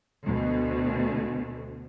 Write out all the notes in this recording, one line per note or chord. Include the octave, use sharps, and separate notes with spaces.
D2 B2